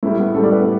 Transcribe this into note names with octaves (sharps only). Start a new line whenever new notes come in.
A2 G3 E4
B3
A2 G3 A4
D5
B4
B3